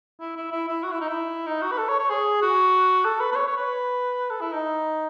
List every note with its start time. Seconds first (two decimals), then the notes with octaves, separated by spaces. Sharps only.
0.20 E4
0.36 E4
0.51 E4
0.68 E4
0.83 F#4
0.92 E4
1.01 D#4
1.08 E4
1.46 D#4
1.62 F#4
1.71 B4
1.78 A4
1.89 C#5
1.99 C#5
2.10 G#4
2.42 F#4
3.05 A4
3.20 B4
3.32 B4
3.36 C#5
3.47 C#5
3.57 B4
4.30 A4
4.41 E4
4.52 D#4